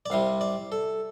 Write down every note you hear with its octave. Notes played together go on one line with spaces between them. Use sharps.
D5
C2 C3 G3 F5
D5
A4